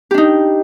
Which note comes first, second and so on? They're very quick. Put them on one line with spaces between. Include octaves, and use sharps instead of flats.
G4 D4 D#4